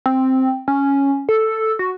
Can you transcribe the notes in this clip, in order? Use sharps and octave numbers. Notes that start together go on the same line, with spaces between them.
C4
C#4
A4
F#4